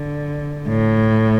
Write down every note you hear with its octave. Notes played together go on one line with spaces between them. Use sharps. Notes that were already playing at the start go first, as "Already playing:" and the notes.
Already playing: D3
A2